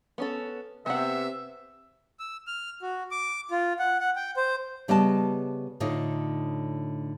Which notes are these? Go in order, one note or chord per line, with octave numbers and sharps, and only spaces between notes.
B3 C#4 A4
C3 B3 E5 F#5
E6
F6
F#4
D6
F4
F#5
F#5
G5
C5
C#3 G3 B3 D#5 A5
A2 D3 D#4 F4